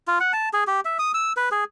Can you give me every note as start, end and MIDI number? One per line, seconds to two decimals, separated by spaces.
0.07 0.19 65
0.20 0.32 78
0.33 0.49 81
0.53 0.64 68
0.67 0.80 67
0.85 0.98 76
0.99 1.12 87
1.14 1.33 88
1.37 1.49 71
1.51 1.64 68